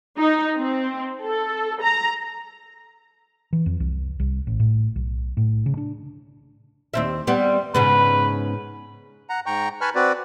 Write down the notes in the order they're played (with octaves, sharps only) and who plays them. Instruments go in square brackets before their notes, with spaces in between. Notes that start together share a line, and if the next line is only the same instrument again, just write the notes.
[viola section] D#4
C4
A4
A#5
[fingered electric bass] E3
F2
C2
C2
A1
A2
B1
A2
C#3
D4
[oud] D#2 C4 E5
[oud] G3 B3 [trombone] C4
[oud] G#2 C#3 B3 [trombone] B4
[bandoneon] F#5 A#5
G#2 G5 A#5 C#6
B4 G#5 A5 B5 C#6 F6
C4 F#4 B4 D5